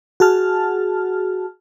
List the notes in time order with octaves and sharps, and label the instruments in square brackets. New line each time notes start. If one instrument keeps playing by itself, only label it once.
[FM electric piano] F#4 G#4 A5 F6